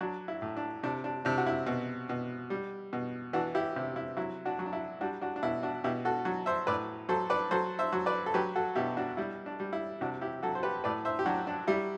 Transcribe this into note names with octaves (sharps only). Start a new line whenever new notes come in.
F#3 D4
E4
A2
D4
C3 D4
D4
C3 D4
F#4
E4
B2
B2
G3
B2
E3 D4 F#4
E4 G4
C3 E4
E4
F#3 E4
D4 F#4
F#3
D4
E4
G3 D4 F#4
D4 F#4
D4
B2 E4
D4 F#4
B2 E4 G4
F#4 A4
F#3
C5 E5
A2 B4 D5
F#3 A4 C5
B4 D5
F#3 A4 C5
C5 E5
F#3
B4 D5
A4
F#3 G4 B4
F#4 A4
B2 E4 G4
D4 F#4
G3 E4
D4
G3
E4
C3 D4 F#4
E4 G4
F#3 F#4 A4
C5
G4 B4
A2 B4 D5
C5 E5
G4
F#3 D4 F#4
D4
G3 E4